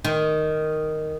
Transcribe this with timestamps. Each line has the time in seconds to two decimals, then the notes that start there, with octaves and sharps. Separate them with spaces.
0.05 D#3